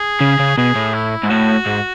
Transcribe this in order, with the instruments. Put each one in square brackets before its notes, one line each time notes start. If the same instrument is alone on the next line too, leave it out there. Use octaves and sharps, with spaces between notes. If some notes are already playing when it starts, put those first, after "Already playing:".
Already playing: [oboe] G#4
[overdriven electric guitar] C#3
C#3
[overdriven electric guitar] B2 [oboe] G#4
[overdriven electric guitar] A2
[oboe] E4
[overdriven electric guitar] G#2
[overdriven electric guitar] A2 [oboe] F#4
[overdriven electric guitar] G#2